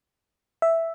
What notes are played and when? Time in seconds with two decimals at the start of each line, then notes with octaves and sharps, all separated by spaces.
0.62 E5